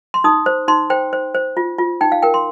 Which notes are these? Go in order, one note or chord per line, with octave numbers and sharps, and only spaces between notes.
C6
D#4 D#6
C5
D#4 C6
C5 G5
C5
C5
F4
F4
D#4 G5
F5
A#4 G5
C6